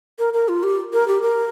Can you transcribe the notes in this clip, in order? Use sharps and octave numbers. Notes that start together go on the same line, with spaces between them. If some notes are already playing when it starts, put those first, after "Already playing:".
A#4
A#4
F4
G4
A#4
G4
A#4